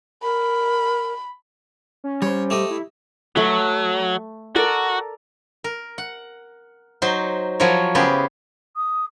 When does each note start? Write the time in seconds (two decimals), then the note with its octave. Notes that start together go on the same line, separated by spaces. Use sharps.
0.23 A#4 B5
2.04 C#4
2.22 G3 C5 C#5
2.50 A3 G4 D#5
2.70 E4
3.36 F#3 A3 B4
4.56 F#4 A4 A#4 D5
5.64 A#4
5.98 F#5
7.02 F#3 D#4 C5 C6
7.60 F3 F#3 E4 A#4 C#5
7.95 C#3 B3 G4 G#4 A#4 C5
8.76 D#6